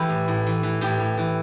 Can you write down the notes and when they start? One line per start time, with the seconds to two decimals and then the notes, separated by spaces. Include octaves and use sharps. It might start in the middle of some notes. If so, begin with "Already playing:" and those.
Already playing: E3 A3 E4 G4
0.09 A2
0.28 A2
0.46 E3
0.63 E3
0.81 A2 G4
0.99 A2
1.18 E3